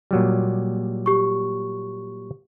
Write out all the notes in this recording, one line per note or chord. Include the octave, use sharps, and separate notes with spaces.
A#2 F#3 G3
G4 C#6